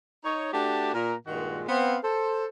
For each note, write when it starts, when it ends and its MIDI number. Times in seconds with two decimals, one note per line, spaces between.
0.24 0.51 63
0.24 0.51 73
0.53 0.91 57
0.53 0.91 62
0.53 0.91 66
0.53 0.91 67
0.53 0.91 81
0.93 1.14 46
0.93 1.14 70
1.27 1.62 43
1.27 1.62 46
1.27 1.62 51
1.27 1.62 56
1.27 1.62 65
1.27 1.62 66
1.69 1.97 59
1.69 1.97 60
1.69 1.97 77
2.03 2.45 69
2.03 2.45 72